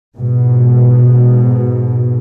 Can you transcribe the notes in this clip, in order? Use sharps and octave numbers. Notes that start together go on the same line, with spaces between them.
G#2 B2